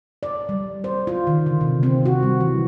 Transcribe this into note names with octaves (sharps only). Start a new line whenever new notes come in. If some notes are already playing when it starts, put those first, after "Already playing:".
D5
G3
C5
F4
D#3
D3
C3
C4
F#4
G3
E3